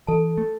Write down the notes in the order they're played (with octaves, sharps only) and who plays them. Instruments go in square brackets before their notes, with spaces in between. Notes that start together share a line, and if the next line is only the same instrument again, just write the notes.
[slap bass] E3 [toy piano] A4 A5
[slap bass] A3